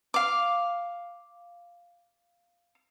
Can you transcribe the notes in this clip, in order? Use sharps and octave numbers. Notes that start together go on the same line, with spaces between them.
F5 D6